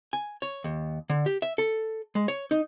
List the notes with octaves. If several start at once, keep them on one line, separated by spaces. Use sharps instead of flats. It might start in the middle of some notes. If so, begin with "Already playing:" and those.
G#5
C#5
D#2
D3
G4
E5
A4
G#3
C#5
D#4